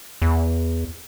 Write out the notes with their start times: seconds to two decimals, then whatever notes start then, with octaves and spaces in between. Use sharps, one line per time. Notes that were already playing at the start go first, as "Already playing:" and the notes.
0.22 E2